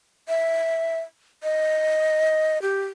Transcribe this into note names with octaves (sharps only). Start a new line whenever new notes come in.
E5
D#5
G4